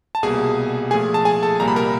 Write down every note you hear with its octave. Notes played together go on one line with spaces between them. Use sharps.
A5
C2 B2 G3 A#3 G#4 G#5
A#2 F3 A3 G#4 G#5
A5
G#4 G#5
A4 A5
C2 A#2 G3 A#3 A#5
B5
A#4 A#5